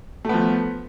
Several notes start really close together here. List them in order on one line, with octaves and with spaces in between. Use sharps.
A3 B3 F3